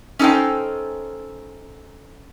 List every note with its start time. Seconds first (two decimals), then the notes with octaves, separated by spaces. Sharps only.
0.19 C#4 D#4 A4 C5 G5